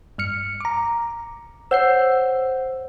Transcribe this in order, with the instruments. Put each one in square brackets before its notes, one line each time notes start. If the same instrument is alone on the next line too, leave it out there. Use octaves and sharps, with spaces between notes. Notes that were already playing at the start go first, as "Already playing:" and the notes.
[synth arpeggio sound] G2 F6 C#7
A#5 D6
[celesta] C5 C#5 F#5 [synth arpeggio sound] E6 G6 C7